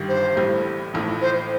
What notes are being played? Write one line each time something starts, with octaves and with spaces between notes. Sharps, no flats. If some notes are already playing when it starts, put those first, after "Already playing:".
Already playing: G1 G2 D#3 G3
C5
A1 A2 G3
A1 A2 F3
C5